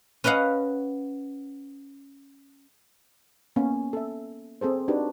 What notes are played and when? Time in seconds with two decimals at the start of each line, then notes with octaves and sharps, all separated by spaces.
0.24 C#4 B4 D#5 F5 F#5
3.56 A#3 B3 C#4
3.93 A4 E5
4.61 C4 G#4 A4 C5
4.88 D4 D#4 F#4 G4 A#4 B4